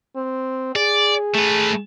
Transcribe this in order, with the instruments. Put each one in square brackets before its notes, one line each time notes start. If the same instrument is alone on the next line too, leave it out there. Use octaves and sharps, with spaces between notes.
[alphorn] C4
[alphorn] G#4 [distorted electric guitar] D5
[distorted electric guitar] A3 B4